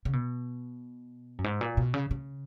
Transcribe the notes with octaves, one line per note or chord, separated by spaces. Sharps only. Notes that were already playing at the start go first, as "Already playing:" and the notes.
C#3
B2
F#2
G#2
A#2
B2
C#3
C#3